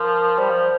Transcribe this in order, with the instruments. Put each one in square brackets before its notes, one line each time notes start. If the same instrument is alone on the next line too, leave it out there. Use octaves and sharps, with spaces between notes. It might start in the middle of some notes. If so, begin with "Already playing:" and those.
Already playing: [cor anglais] F3 [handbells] A#4
[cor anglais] G3 [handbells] C5
[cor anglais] F3